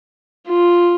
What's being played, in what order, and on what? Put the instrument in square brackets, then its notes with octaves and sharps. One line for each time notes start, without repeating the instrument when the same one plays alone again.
[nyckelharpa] F4